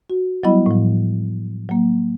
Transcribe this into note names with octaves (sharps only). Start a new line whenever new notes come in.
F#4
F#3 G3 B3 E4 D#5 B5
A2 F3
F#3 A#3